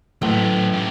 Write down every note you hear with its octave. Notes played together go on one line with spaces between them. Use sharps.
A1 F#3 A3
G#2 G4